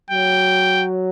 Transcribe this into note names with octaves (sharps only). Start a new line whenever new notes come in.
F#3 G5